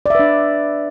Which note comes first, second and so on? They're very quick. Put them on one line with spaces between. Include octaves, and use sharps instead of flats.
D5 E5 B4 D4